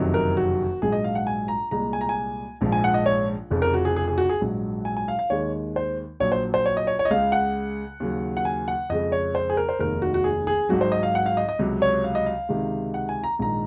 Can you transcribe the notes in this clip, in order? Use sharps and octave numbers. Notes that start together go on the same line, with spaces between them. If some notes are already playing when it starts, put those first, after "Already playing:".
Already playing: F#1 F2 C3 D#3 F#3
A#4
F#4
A#1 G#2 F#3 G#4
D#5
F5
F#5
G#5
A#5
C2 A#2 G#3 A#5
G#5
A#5
G#5
A#1 G#2 F3
G#5
F#5
D#5
C#5
F1 F2 C#3 F3
A#4
F#4
G#4
G#4
G#4
F#4
G#4
A#1 G#2 F#3
G#5
G#5
F5
F5
D#2 D#3 G#3 C#5
C5
A#1 A#2 F#3 C#5
C5
C5
C#5
D#5
C#5
C#5
D#5
C#2 C#3 G#3 F5
F#5
D#2 C#3 F#3
F#5
G#5
F#5
F2 C#3 G#3 D#5
C#5
C5
G#4
A#4
C5
F1 D#2 D#3 G#3 A#4
F#4
F#4
G#4
G#4
G#1 G#2 F#3 F#4
C5
D#5
F5
F#5
F5
D#5
D#5
C#2 C3 F#3
C#5
F5
D#5
F5
C#2 C3 D#3 G#3
F#5
G#5
A#5
A#1 G#2 D#3 A#5